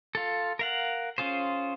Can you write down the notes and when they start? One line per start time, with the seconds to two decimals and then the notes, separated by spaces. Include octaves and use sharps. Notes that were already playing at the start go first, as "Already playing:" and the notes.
0.15 F4 A4
0.59 A#4 F5 F#5
1.18 C#4 F4 G#4 C5